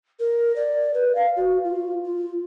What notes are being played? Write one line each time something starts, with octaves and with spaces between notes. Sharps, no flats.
A#4
D5
B4
F5
F#4
F4
F4